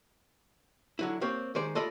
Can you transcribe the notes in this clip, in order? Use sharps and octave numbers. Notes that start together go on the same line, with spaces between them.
D3 F#3 E4
A#3 C4 G4 C#5
D#3 G#3 C5 D5
F4 A4 D5 D#5 B5